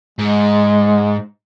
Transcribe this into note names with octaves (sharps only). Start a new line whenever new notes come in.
G#2 G#3